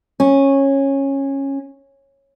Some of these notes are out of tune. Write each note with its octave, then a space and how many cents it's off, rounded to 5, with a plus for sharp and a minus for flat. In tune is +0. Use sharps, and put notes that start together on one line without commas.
C#4 -15